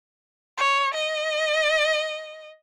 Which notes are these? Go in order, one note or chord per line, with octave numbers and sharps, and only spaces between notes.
C#5
D#5